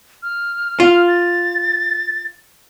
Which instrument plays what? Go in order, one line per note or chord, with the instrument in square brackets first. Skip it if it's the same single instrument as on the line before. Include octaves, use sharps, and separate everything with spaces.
[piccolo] F6
[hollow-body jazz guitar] F4
[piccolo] A6